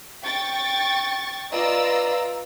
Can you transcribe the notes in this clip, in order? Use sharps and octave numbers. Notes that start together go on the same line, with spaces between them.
G5 C#6 A6
F4 B4 D5 D#5 A#5 E6